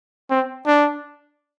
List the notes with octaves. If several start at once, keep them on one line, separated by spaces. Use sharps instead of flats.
C4
D4